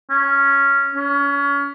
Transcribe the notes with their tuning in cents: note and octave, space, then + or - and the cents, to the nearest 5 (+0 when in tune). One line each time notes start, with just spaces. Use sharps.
C#4 +0
C#4 +30